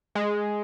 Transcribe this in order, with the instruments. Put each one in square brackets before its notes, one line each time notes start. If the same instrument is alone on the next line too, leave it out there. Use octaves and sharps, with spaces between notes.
[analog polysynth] G#3